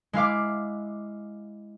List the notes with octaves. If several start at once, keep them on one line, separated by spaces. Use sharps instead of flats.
G#3 E4 F5 D6